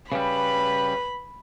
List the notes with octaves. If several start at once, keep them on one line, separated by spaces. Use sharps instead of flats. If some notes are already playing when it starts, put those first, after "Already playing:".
C#3 G3 B4 B5